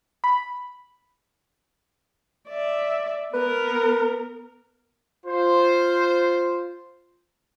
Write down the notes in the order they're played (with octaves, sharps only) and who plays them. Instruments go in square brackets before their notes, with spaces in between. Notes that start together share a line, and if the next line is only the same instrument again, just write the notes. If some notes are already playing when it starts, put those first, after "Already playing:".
[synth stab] B5
[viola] D5 E5
[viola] B3 A#4 [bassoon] B4
[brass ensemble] F4 C5